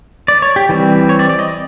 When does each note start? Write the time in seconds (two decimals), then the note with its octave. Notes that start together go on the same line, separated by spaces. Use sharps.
0.28 D5
0.42 C#5
0.56 G4
0.69 E3 G3 C4
1.09 C#5
1.19 D5
1.29 D5
1.39 D#5